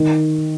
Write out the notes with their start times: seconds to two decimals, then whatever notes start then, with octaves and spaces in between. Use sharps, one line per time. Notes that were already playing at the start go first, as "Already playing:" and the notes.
Already playing: D#3